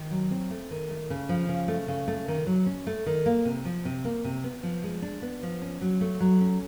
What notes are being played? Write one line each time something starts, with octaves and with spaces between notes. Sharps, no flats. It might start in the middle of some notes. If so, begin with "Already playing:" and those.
Already playing: D#3
F#3
C4
A3
D#3
A3
C#3
F3
C#3
A3
C#3
A3
D#3
F#3
C#4
A3
D#3
A#3
C3
F3
C3
A#3
C3
B3
F3
G#3
D4
B3
F3
C#4
F#3
A3
F#3
C#4